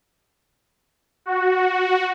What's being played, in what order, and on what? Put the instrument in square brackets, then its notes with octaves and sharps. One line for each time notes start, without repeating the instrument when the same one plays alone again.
[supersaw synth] F#4